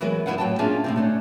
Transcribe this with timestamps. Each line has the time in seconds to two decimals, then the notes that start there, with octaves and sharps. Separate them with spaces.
0.01 E3 F#3 G#3 B3 A#4 B4
0.26 F#2 E3 E4 B4 F5 F#5
0.38 A2 F#3 G5 A5
0.59 A#3 C#4 D4 F4 G#4 E5
0.84 A2 C3 C4
0.96 A3 C#4 D4